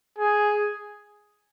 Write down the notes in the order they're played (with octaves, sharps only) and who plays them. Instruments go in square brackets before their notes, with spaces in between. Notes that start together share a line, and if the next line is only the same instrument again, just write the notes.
[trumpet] G#4